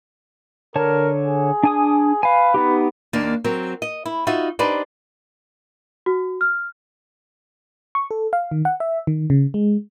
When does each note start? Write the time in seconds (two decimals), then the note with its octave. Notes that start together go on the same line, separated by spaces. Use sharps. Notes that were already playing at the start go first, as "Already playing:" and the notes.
0.76 D3 A#4 C#5 A5
1.25 G#4
1.63 D4 G#5 D#6
2.23 B4 F5 G#5
2.54 B3 D#4 G4
3.13 D#2 A#3 D4
3.44 F#3 C4 A#4
3.82 D#5
4.06 E4
4.27 D#4 F4 F#4 E5
4.59 D4 D#4 G4 B4 C5 D5
6.06 F#4
6.41 F6
7.95 C#6
8.11 A4
8.33 F5
8.51 D#3
8.65 F#5
8.80 E5
9.07 D#3
9.30 C#3
9.54 G#3